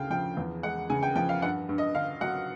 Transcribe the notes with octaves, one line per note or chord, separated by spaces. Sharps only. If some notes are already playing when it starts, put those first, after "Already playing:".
Already playing: D2 C#3 F5 G5
F3 G5
E2
G#3 F#5
C#3 G#5
G5
F3 G5
F5
G2 F#5
G2
D#5
D3 F5
F#3 F#5